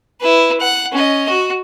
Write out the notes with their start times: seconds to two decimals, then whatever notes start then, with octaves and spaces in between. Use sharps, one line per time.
0.21 E4 B4
0.60 F#5
0.92 C#4 D#5
1.29 F#4